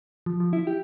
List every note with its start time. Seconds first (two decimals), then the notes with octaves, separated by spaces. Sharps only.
0.26 F3
0.40 F3
0.53 E4
0.67 G4